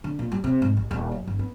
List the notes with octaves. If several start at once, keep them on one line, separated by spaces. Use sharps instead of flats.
D3
A#2
G3
C3
G#2
A1
D#1
F#2
G1
B3